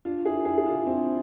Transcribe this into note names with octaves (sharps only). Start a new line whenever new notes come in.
D4 F4
E4 G#4
E4 G#4
G#4
D4 F4
C4 E4